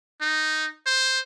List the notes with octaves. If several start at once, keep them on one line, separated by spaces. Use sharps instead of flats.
D#4
C5